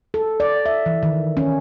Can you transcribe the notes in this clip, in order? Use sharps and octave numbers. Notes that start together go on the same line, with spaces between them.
A4
D5
E5
E3
D#3
C#4